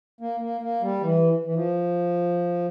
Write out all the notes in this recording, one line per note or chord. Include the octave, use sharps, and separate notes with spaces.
A#3
A#3
A#3
G3
E3
E3
F3